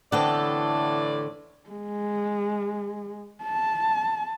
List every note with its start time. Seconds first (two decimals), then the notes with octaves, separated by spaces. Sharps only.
0.12 A2 D3 E3 B3 C4 A4 D5 G5
1.69 G#3
3.43 A5